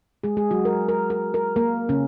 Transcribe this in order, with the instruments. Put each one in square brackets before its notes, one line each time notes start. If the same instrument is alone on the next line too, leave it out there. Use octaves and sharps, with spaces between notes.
[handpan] G#3 G#4
G#3 G#4
F#3 F#4
A#4
A#4
A#4
A#4
A#3 A#4
C#3 C#4